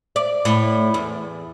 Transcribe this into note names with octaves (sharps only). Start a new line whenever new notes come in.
D5
A2
E2